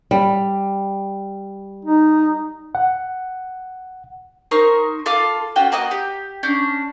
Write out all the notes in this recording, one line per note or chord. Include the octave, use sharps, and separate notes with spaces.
G3
D#4
F#5
D#4 A#4 C5 C#6
F4 A4 F5 D6
C#4 F4 F#4 G5
A#3 F#4 D#5 F#5
G4
C#4 D4 G6